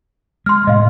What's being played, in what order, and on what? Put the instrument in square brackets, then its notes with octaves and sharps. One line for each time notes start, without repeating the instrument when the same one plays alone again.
[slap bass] G#3 [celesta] C6 F6
[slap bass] A2 C3 G#3 [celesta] D#5 F5